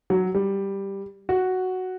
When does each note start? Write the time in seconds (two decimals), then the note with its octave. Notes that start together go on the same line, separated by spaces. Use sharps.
0.10 F#3
0.35 G3
1.29 F#4